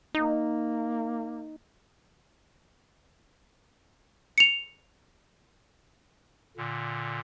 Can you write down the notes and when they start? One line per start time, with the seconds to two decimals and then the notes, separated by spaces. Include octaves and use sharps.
0.15 A#3 D#4
4.38 C#7 F7
6.57 A#2 D3